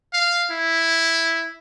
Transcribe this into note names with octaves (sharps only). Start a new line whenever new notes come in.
F5
E4